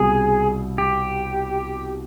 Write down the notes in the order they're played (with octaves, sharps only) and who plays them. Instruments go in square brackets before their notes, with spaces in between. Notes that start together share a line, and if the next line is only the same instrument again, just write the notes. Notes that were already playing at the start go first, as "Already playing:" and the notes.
Already playing: [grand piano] C2 B2 G3 C4 [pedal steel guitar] G#4
[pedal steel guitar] G4